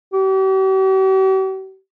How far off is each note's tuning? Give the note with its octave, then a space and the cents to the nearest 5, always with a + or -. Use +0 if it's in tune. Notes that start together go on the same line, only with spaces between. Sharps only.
G4 -45